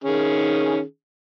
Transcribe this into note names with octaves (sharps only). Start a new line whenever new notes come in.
D#3 C#4 G#4